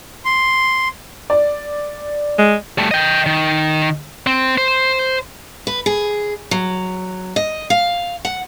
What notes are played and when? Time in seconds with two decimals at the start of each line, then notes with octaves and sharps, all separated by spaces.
0.25 C6
1.30 D5
2.38 G#3
2.78 G3 A3
2.91 D#5 G5
3.26 D#3
4.27 C4
4.58 C5
5.67 B4
5.86 G#4
6.51 F#3
7.36 D#5
7.70 F5
8.25 F#5